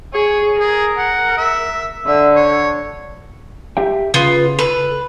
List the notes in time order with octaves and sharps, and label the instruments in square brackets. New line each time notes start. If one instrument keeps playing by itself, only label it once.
[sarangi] G#4 [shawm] C#5
[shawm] G#4 [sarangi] A#4
[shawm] F#5
E5
[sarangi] D3 [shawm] E5
[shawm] C#5
[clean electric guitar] G4 E5 G5
[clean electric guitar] C#3 [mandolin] B3 F4
[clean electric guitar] A4 [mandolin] B4